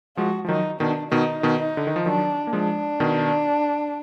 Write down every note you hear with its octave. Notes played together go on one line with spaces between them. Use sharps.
F3 G#3 F#4
F3
D#3 F#3 D#4
B2 D#3 D4
B2 D#3 D#4
B2 D#3
D#4
D3
D#3
F3
D#3 F#3 D4
A#3
F3 G#3 D4
B2 D#3